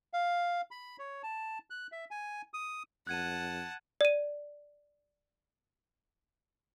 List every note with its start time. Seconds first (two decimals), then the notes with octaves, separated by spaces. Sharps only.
0.13 F5
0.71 B5
0.99 C#5
1.23 A5
1.70 F#6
1.92 E5
2.11 G#5
2.54 D#6
3.07 F2 F#5 A5 F#6 G#6 D#7
4.01 D5 D#7